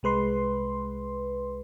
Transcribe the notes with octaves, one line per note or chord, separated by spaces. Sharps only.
C2 G#3 B4 C6